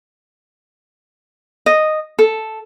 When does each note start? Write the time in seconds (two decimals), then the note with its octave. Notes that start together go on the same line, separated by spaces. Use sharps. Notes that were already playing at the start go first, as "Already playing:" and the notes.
1.66 D#5
2.19 A4